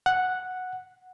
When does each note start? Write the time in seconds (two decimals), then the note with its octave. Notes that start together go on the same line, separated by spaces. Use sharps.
0.06 F#5